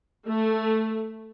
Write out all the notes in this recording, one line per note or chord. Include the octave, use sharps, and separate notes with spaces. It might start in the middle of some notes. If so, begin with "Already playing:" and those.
A3